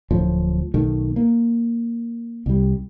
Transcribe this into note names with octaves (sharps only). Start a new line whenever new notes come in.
D1 A2 F3
B1 D#3 A3
A#3
C2 G3